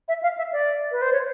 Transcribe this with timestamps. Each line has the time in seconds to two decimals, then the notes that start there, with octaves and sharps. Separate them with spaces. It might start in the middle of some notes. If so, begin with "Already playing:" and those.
0.08 E5
0.23 F5
0.38 E5
0.52 D5
0.92 B4
1.02 C5
1.13 C#5